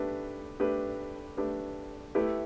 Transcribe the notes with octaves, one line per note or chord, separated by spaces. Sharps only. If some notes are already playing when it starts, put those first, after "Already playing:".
Already playing: A3 D4 G4 B4
A3 D4 G4 B4
A3 D4 G4 B4
A3 E4 G4 B4